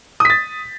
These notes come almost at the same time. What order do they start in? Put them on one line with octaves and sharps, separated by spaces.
D#6 B6 A6